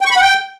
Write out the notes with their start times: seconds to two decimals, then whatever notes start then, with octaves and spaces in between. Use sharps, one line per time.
0.01 G5
0.06 C#6
0.11 B5
0.16 F#5
0.21 G5